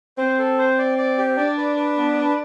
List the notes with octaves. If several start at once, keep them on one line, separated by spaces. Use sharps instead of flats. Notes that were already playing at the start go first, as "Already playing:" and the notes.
C4 C5
A4
C5
D5
D5
G4
D4 D5
B4
B4
B3
B4